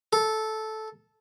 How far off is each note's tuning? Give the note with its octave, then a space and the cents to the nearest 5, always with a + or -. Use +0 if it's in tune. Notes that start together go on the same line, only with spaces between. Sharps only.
A4 -10